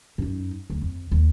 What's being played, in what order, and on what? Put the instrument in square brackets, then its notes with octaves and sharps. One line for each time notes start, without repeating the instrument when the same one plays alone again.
[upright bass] F#2 D#4
D2
F2
D#2